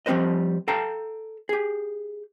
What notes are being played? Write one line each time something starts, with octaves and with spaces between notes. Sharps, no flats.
F3 G3 C4 B4 C5 D#5
A4 F5 G5 A5 A#5
G4 G#4